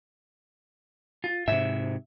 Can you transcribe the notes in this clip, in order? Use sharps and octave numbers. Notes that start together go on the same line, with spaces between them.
F4
G#2 C3 E5